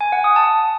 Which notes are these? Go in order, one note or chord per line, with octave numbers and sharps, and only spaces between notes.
G#5
F#5
D#6
A5